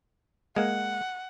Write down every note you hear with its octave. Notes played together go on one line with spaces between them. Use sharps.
G#3 A#3 F#5